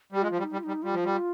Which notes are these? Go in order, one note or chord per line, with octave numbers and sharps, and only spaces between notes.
G3 G4
G#3 F4
F3
G3
D#4
G3
F4
G3 D#4
G3 F4
F3
G3